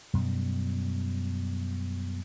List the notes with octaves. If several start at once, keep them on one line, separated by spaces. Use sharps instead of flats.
F#2 B2 G3